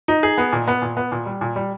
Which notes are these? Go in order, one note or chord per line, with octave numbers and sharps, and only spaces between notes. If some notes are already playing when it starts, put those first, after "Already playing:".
D#4
G#4
B3
A#2
B3
A#2
B3
A#2
G3
A#2
G3